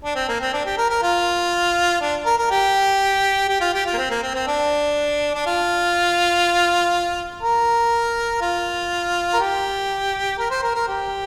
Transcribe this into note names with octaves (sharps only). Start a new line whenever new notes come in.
D4
C4
A#3
C4
D4
G4
A#4
A#4
F4
D4
A#4
A#4
G4
G4
F4
G4
F4
A#3
C4
A#3
C4
C4
D4
D4
F4
A#4
F4
A#4
G4
A#4
C5
A#4
A#4
G4